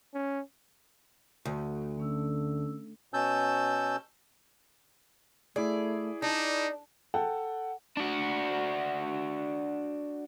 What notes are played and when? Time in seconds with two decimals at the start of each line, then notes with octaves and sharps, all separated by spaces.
0.14 C#4
1.45 D2 F#4
1.98 D3 A3 C#4 E6
3.14 B2 C#4 A5 E6 G6
5.56 A3 E4 G#4 D5
6.22 D4 D#4 D5
7.14 A4 F#5 G5 A5
7.97 D4 F#4